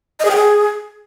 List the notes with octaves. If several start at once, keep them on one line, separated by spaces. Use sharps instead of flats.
D#5
G#4
G5
G#4